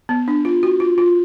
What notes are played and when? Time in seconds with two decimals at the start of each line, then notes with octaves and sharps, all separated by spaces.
0.09 B3
0.28 D4
0.45 F4
0.63 F#4
0.80 F4
0.98 F4